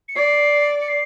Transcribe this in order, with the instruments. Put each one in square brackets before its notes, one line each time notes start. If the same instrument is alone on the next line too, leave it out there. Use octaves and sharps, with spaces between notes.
[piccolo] C#7
[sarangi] D5 [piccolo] C7
[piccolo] C#7
C7